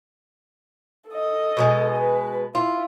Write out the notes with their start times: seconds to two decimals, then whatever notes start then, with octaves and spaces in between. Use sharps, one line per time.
1.09 A4 D#5
1.57 B2 F3 G#3
1.98 B4
2.55 E4 F4